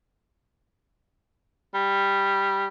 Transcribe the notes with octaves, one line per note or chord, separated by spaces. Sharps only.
G3